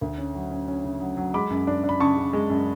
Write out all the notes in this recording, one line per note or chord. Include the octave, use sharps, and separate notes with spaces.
D2
C#4
F#3
C#4
C#4
C#3
F#3
F#3
G#3 B5 D6
F#2
D4
D4
B5
C#3 A5 C#6
C#3
G#3
F#2